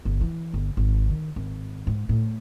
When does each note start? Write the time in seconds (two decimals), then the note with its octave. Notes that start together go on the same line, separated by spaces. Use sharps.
0.05 G1
0.21 E3
0.54 G1
0.77 G#1
1.09 D#3
1.36 G#1
1.87 G#2
2.09 A2